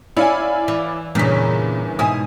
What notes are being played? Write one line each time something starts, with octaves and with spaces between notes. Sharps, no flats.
C#4 E4 D5 F5 G#5
E3
E2 G2 A#2 C#3 E3 B6
G#2 B2 E4 G#5 D#6